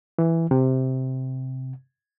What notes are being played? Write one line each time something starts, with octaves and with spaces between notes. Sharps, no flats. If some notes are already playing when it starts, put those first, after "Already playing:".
E3
C3